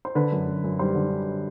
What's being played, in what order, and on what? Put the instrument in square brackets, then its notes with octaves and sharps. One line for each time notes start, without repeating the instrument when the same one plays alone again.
[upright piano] C5
D3 B4
F#2
F#2
F#2
G3 C5
D3